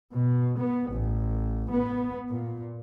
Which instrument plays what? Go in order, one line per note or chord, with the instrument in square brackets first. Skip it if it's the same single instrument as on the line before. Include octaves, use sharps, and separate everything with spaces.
[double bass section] B2
B3
A1
B3
A#2